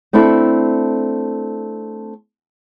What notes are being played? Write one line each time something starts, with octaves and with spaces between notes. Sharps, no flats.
A3 C4 D4 E4 A4